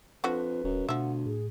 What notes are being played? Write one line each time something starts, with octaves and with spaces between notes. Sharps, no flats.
F2 D3 F3 F#4 B4
D#1 F#2
D2 B2 F3 E5 F#5
A2 G#4